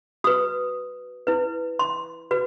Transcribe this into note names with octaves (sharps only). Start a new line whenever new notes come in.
F#4 B4 D#6
E4 B4
C6
F#4 B4